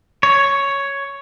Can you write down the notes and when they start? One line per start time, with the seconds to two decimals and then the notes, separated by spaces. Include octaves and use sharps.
0.23 C#5